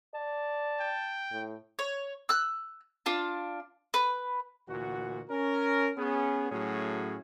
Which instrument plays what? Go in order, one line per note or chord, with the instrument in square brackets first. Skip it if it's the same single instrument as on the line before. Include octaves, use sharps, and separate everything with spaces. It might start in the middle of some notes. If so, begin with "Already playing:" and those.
[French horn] D5 [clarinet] A5
[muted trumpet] G5
[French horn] A2
[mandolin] C#5
E6 F#6
D4 F4 A5
B4
[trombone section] D2 A#2 E3 F#4
C#4 A#4
B3 C#4 G#4
A2 F#3 A3 C#4 F#4 G#4